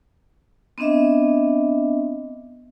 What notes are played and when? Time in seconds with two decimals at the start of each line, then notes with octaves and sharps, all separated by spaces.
0.78 B3 C4 D4 D#5 E5